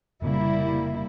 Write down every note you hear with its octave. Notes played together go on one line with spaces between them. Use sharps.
F1 A#2 C#3 G3 A#3 E4